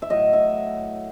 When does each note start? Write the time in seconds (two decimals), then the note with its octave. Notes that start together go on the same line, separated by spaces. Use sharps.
0.02 E5
0.10 A2 F#3 D#5
0.33 E5